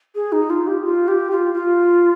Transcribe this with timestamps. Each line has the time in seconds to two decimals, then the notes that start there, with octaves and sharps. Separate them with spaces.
0.15 G#4
0.32 D#4
0.50 F4
0.67 G4
0.85 F4
1.08 G4
1.31 F4
1.54 F4